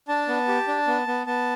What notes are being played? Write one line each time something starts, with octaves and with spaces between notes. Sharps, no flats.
D4 A5
B3
G4
D4
B3
B3
B3 A5